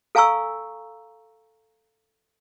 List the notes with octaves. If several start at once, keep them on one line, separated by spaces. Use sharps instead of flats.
A4 F5 G#5 A#5 C#6 E6